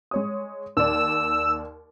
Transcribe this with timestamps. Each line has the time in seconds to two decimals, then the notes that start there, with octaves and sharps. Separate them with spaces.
0.11 G#3 C#5 D#6
0.77 D#2 D5 E6